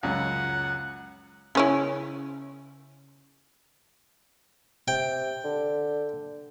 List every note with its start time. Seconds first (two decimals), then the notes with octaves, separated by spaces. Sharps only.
0.03 C#2 F#2 C#3 F#5
1.55 C#3 C#4 E4
4.88 C3 G5
5.45 D3